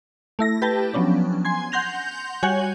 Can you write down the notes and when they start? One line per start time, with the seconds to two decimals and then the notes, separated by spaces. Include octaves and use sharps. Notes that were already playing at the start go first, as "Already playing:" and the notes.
0.39 A3 E4 A#6
0.62 G4 B4 G5 A5
0.94 F3 F#3 B3 C#4 D4
1.45 G#5 C6 G#6
1.72 F#5 C6 G6 A#6 F7
2.43 G3 F#4 C#5 G#5 G6 F#7